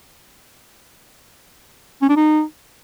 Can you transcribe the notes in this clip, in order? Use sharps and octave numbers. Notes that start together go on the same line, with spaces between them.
C#4
D4
D#4